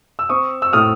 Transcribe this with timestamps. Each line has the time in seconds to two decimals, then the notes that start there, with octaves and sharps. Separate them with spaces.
0.19 E6
0.29 C4 C#6 D#6
0.62 E6
0.73 A2 D#6 F6